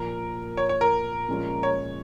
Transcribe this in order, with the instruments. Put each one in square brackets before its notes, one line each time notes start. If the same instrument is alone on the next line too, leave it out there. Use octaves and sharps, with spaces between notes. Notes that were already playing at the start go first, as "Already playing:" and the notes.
Already playing: [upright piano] A#2 F3 A#3 [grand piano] A#4
[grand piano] C#5
C#5
A#4
[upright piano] A#2 F3 G#3 C#4 F4
[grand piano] C#5